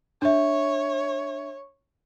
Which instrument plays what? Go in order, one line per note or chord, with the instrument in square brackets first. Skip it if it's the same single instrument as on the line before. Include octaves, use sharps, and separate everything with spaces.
[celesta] D4 E5 [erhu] C#5